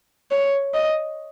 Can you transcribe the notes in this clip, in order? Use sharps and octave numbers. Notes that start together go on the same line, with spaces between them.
C#5
D#5